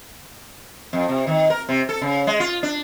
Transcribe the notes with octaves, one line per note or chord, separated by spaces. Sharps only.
F2
C3
D#3
A#4
C3
A4
C#3
G#3
F4
D4